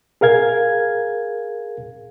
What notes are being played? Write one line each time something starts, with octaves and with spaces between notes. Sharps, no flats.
G#4 A#4 F5 G#6